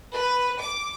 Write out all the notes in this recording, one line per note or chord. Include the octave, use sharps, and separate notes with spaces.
B4
D6